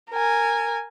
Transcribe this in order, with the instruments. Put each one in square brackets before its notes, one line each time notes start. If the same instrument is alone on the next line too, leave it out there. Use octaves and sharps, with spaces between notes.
[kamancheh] A#4 G#5